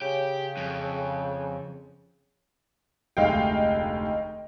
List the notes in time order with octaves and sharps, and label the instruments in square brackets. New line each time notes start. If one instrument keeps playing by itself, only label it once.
[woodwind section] C#3 [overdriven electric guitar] G4
[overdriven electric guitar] F2
[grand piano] F1 D2 G#3 [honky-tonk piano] D#4 F5 G5